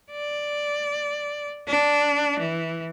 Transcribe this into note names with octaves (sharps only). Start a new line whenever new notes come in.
D5
D4
E3